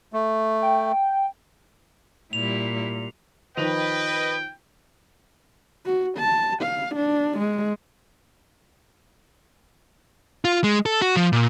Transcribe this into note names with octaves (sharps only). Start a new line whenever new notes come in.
A3
G5
A#2 G3 E4 F7
D#3 F3 B4 D#5 G5 F7
F#4
A5
F5
D4
G#3
F4
G#3
A4
F#4
F3
A#2